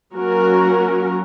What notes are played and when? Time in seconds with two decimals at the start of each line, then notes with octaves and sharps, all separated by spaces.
0.14 F#3 A#3 C#4 F#4 A#4